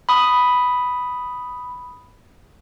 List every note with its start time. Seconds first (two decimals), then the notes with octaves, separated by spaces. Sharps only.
0.09 B5 D#6